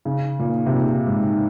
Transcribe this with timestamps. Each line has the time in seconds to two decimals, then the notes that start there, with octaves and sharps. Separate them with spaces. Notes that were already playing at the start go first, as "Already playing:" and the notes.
0.05 C#3
0.39 A#2
0.66 C3
0.74 A#2
1.07 G#2